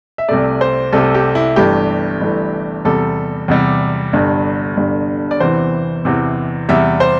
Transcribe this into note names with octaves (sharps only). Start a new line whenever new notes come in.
E5
C2 C3 A3 D5
C5
C2 C3 A3 A4
G4
E4
G1 G2 E3 A3 G4
G1 G2 E3 A3
E2 C3 G3 A4
E2 C3 G3
G1 G2 D3
G1 G2 D3
D5
E2 C3 E3 C5
E2 C3 E3
E2 C3 G3 E5
C5